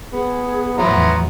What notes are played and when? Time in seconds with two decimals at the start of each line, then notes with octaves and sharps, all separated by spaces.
0.13 B3 G#4
0.78 E2 A2 F3 F#3 B3 E4 A#5 C6